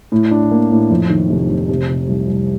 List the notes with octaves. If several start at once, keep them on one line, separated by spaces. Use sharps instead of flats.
A2
D4
A#3
A2
F2
D#3
F1
F1
C3
C3
C2
C2